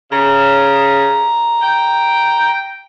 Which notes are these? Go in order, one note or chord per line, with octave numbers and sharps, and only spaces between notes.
C#3 A#5
G5